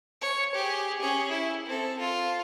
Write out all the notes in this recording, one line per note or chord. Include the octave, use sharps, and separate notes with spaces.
C#5
G4 G#4
C#4 G#4
E4
C4 A4
F4